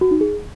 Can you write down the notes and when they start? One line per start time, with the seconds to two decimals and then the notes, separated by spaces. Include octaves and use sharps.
0.01 F#4
0.11 D#4
0.21 G#4